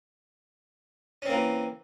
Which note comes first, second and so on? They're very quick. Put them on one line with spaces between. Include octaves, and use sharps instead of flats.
C#4 C4 A#3 E3